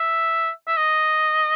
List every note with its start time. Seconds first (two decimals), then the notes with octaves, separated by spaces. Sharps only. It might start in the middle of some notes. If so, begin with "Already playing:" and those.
Already playing: E5
0.67 E5
0.77 D#5